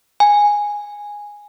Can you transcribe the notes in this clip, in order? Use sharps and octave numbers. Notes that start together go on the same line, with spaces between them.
G#5